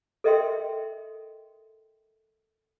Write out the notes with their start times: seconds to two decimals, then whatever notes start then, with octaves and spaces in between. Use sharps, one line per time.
0.24 A4 A#4 D#5 E5 G5 C6